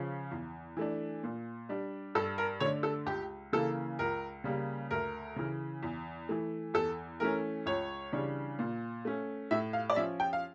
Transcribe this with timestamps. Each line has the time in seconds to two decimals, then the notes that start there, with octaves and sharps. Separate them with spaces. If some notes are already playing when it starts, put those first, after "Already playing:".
Already playing: C#3 F3 C#4
0.31 E2
0.77 E3 A3 D4
1.23 A#2
1.69 G3 D4
2.15 G2 A4
2.38 A#4
2.60 D3 A3 D4 C#5
2.83 A4
3.06 C#2 G4
3.53 C#3 E3 A#3 A4
3.99 C#2 A#4
4.44 C#3 G3 A#3
4.91 D2 A#4
5.36 C#3 E3
5.83 E2
6.29 E3 A3
6.74 E2 A4
7.20 E3 A3 C#4 A#4
7.66 C#2 C#5
8.12 C#3 E3 G3 D4
8.59 A#2
9.05 A3 C#4
9.51 A2 E5
9.73 F5
9.90 D5
9.96 F3 C#4 E5
10.20 G5
10.33 F5